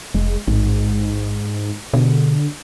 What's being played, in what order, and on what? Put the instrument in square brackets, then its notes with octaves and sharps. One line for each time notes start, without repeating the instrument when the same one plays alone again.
[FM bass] F1 [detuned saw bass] G#3
[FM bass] A1 [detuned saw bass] G#2
[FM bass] B2 [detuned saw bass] D3